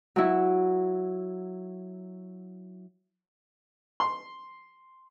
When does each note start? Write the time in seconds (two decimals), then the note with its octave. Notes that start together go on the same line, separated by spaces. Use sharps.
0.16 F#3 E4
4.00 C6